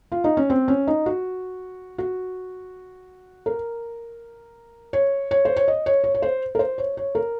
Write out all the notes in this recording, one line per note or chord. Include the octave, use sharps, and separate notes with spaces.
F4
D#4
C#4
C4
C#4
D#4
F#4
F#4
A#4
C#5
C#5
C5
C#5
D#5
C#5
C#5
C#5
C5
A#4
C5
C#5
C#5
A#4